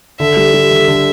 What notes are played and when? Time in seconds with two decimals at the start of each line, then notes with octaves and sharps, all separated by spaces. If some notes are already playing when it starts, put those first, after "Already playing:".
0.20 D3 E5
0.37 G3
0.54 G3
0.71 D3
0.88 D3